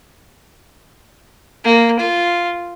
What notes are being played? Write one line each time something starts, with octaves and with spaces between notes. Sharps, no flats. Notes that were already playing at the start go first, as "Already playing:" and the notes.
A#3
F4